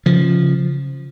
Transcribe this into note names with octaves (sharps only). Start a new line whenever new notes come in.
C#3 F3